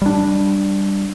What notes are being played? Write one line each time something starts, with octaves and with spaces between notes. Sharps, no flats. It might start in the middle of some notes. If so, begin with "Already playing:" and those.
G3 D4